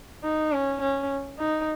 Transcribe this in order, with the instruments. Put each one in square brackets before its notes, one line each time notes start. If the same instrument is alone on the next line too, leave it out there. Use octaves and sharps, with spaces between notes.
[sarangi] D#4
C#4
C#4
D#4